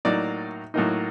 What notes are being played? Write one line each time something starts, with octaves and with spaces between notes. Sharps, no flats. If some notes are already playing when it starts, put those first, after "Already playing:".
A2 F#3 A#3 D#4 D5
A2 F#3 A#3 D#4